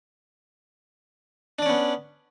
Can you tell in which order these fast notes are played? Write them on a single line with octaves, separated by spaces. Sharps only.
D4 D5 C#4 B3